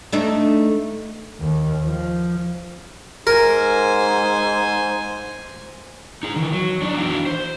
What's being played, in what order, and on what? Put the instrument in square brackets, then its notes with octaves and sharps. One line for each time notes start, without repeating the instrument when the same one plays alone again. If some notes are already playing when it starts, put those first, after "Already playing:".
[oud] A3 D4 D#4
[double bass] D#2
F3
[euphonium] G#2 [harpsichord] A#4 [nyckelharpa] C5 G#5
[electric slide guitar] D#4 G#4
D#3 E3
F#3
D4 D#4 D5
E3 D4 E4 F#4 F5 G5
C5